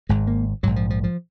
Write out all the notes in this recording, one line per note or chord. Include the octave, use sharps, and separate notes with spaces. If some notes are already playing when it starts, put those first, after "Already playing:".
G#1 G#2 G#3
A#3
A#1 G#2 F#3
F3
F3
F3